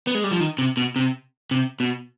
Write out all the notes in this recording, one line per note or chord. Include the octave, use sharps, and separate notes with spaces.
B3
G#3
G3
F3
D#3
C3
B2
C3
C3
B2